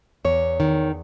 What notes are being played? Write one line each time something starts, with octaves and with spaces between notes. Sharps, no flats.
E2 C#5
D#3